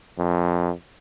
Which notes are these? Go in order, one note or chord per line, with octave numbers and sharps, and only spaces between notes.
F2